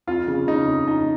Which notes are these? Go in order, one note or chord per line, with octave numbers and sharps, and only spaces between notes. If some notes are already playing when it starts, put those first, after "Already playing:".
F2 F4
C#3
C#3 D#4
F2
F2 D#4